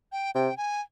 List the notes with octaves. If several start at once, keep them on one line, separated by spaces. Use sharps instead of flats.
G5
C3 G5
G#5